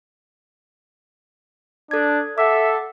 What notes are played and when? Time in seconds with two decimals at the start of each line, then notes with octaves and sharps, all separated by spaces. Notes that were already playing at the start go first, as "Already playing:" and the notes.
1.91 D4 A4 G#6
2.38 A4 E5 F#5 D6